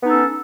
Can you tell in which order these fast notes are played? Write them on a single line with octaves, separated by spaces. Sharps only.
B3 D#4 A4 C#4